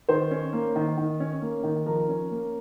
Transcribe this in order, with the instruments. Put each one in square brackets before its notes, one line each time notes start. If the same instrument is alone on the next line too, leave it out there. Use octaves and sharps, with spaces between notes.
[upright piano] D#3 C5
C#4
A#3
D#3
D#3
C#4
A#3
D#3
F3 A#4
C#4
A#3